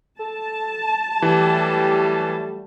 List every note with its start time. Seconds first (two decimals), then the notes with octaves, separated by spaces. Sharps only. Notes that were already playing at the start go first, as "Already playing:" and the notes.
0.19 A4 A5
1.22 E3 F#3 G3 A3 G4